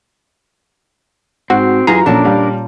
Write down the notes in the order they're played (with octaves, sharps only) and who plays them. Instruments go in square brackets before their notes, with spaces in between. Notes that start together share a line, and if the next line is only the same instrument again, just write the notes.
[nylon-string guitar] G#2 [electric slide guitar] C4 [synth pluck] F#4
[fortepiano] F#2 E3 [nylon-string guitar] F4 G4 [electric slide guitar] G#4 [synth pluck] A#5
[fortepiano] F2 A4 [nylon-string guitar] A#2 C#4 A5 [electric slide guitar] D4 A#4
[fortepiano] G3 G4 F5